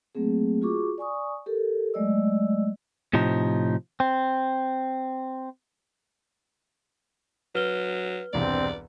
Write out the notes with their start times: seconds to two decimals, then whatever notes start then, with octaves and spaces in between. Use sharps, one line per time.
0.15 F#3 A3 A#3 C4 G#4
0.62 F4 F#4 G#4 C#6 D6
0.98 D5 G#5 C#6 D#6
1.46 G4 A4 A#4
1.94 F#3 G#3 A3 D5 D#5 E6
3.13 A2 C3 F3 D#4
4.00 C4
7.55 F#3 B4 F6 G7
8.33 E1 C2 G2 C4 D5